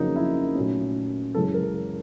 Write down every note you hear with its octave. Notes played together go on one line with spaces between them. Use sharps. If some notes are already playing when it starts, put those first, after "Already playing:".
Already playing: F2 C#3 F#3 A#3 C#4 D#4
E4
A#2 F#3 A3 C#4
F#2 C#3 E3 G#3 A4
A#4